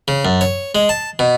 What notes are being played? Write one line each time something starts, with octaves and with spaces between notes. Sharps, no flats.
C#3
F#2
C#5
G#3
A5
B2